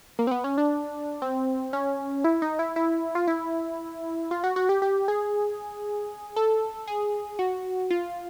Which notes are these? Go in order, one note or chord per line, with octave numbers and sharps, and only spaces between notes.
A#3
C4
B3
C#4
D4
C4
C#4
E4
D#4
E4
E4
F4
E4
F4
F#4
F#4
G4
G4
G#4
A4
G#4
F#4
F4